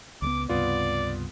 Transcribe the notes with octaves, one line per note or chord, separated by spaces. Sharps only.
C#2 G#3 B3 D6
C#2 G2 C3 B3 F4 D5